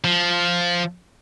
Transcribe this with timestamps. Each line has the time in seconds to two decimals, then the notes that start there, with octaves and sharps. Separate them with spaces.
0.04 F3